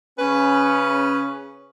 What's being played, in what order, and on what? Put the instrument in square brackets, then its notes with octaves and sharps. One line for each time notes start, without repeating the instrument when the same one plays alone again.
[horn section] C#3 C#4 [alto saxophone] B4